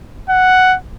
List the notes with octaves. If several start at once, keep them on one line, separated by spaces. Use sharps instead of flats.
F#5